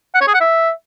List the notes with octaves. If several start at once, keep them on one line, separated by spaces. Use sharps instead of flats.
F#5
C#5
G#4
F#5
E5